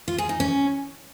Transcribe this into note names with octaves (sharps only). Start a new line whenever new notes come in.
F4
G#4
D#4
C#4